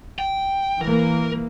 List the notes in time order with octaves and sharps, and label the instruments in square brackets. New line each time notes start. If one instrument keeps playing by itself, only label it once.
[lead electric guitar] G5
[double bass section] E3 A#3 [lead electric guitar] A#4